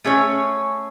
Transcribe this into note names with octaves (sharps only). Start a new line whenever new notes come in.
A3 C#4 G#4 C#5